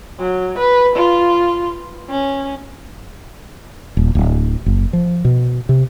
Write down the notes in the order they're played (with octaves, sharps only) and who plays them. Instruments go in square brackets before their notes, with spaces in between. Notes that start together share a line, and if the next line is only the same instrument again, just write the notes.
[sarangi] F#3
B4
F4
C#4
[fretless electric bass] D#1
D1
F#1
F3
B2
C3